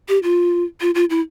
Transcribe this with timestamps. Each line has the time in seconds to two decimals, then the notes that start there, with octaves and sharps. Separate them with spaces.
0.09 G4
0.23 F4
0.81 F4
0.95 F4
1.10 E4